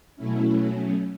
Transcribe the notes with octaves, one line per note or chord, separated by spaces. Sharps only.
B2 F#3 A3 C#4 E4